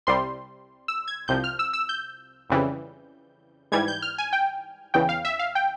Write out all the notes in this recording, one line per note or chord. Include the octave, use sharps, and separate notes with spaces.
C2 C3 G3 C6
E6
G#6
C2 C3 F3 G6
F6
E6
E6
G6
F2 C#3 E3 G3
G#2 E3 G3 G#6
G6
F6
G#5
G5
E2 C#3 E3 G5
F5
E5
F5
G5